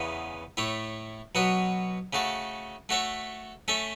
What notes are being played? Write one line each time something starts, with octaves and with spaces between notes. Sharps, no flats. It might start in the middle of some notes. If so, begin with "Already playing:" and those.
Already playing: E2 C#3 E3 B3
A2 A3 E4 C#5
B2 F#3 B3 F#4 C#5
C#3 A3 F#4 A4
A3 F#4 A4 C#5 E5
A3 C#4 A4 E5